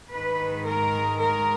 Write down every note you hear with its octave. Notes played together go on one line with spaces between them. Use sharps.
G#2 D#3 G#3 B4
A#4
A#4